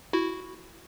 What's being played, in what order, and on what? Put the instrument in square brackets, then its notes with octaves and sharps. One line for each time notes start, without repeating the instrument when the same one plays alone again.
[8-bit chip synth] E4 F#4